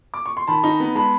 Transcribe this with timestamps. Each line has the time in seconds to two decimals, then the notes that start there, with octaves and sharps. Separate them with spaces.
0.14 D6
0.26 C#6
0.37 C6
0.47 D#3 A5 B5
0.64 D#4
0.80 B3
0.95 G#3 A5 B5